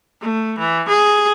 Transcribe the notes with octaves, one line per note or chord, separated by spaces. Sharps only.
A3
E3
G#4